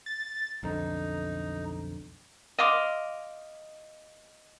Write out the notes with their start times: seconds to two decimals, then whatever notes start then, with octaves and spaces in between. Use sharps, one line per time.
0.06 A6
0.63 B1 F2 D3 D#4
2.58 D#5 F5 C6 D6